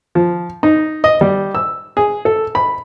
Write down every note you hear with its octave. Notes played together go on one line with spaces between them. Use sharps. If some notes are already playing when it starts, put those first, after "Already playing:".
F3
D#4
D#5
G3
E6
G#4
A4
B5